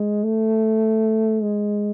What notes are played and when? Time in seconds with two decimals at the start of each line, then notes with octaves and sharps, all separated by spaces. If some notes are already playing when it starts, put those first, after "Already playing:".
Already playing: G#3
0.23 A3
1.42 G#3